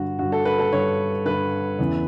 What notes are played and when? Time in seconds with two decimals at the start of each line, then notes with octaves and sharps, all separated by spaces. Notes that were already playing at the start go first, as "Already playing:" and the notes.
Already playing: G2 D3 F#4
0.19 G2 D3 F#4
0.32 A4
0.45 B4
0.59 A4
0.72 G2 D3 C#5
1.25 G2 D3 B4
1.79 E2 C#3 E3